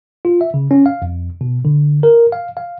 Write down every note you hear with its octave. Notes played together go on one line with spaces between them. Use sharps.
F4
E5
C#3
C#4
F5
F2
B2
D3
A#4
F5
F5